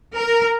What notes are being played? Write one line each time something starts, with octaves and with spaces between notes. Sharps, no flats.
A#4